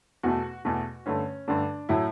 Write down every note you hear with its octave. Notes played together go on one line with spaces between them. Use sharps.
E2 B2 A3 F#4
E2 B2 A3 F#4
G2 D3 A3 C#4
G2 D3 A3 D4
A2 F#3 A3 E4